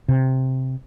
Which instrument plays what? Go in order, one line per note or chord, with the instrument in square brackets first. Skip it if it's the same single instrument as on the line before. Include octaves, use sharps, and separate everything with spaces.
[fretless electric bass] C3